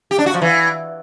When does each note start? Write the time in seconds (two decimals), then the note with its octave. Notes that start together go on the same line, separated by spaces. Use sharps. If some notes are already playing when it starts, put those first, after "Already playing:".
0.11 G4
0.19 D4
0.26 F#4
0.34 F3
0.42 E3